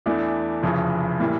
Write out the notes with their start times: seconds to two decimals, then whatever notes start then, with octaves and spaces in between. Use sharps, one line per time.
0.06 E2 E3 A3 D4
0.63 F1 F2 C#3 E3
1.20 A2 E3 G3 A#3